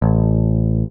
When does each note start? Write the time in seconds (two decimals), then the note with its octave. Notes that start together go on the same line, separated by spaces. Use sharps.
0.02 A1